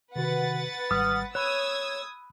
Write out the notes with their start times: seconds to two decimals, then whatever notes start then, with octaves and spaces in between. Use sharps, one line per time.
0.16 C3 D#3 F#4 B4 F#5 A6
0.91 G#1 G3 D#6 F6
1.35 C#5 B5 D#6 E6 F#6 G#6